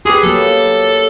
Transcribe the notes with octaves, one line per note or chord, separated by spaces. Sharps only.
G4 G#4 B4
F#3 A#3 A4